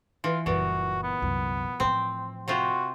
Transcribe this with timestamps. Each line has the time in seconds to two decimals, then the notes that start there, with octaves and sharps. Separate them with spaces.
0.24 E3 F4
0.46 F#1 A#2 E3 G3 F#4
1.03 B3
1.20 C2 F#2
1.80 A2 F3 C4
2.48 C3 C4 F4 F#4